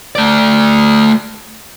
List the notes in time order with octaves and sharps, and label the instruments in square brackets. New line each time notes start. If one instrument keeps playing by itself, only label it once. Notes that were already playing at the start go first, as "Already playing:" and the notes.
[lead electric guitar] A3 D5